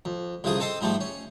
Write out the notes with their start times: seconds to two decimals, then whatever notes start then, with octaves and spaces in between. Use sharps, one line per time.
0.05 F2
0.44 C2 F2 C#3 F4 G#4 D#6
0.60 C4 A4 D#5 A5 C6
0.81 G#2 F3 G3 A3
1.01 C#4